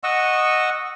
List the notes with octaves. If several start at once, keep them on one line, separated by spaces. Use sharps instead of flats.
D#5 F#5 C#6 E6